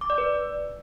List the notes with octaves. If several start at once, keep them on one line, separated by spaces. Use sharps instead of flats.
D6
D5
B4